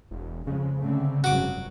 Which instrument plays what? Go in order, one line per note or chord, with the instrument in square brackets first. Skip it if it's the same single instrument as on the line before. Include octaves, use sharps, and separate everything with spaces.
[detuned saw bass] E1
[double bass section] F2 G#3 [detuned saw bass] C#3
[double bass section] D3 A3 C4
[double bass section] F1 G2 F#3 [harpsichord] F#4 D6